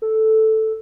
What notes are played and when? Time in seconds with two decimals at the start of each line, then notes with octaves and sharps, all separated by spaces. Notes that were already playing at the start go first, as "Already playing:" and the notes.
0.02 A4